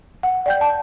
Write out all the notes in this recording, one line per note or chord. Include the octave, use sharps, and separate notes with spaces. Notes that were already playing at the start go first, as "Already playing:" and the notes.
F#5
D5 G5 G6
A5